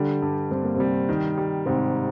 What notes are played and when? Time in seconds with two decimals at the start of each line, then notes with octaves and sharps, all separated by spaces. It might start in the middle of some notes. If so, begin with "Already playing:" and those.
Already playing: D3 G3 D4
0.22 G2
0.51 G2 C4
0.63 A#3
0.76 C3 G3 C4
1.09 D#3
1.38 G3
1.66 G#2 C3 C4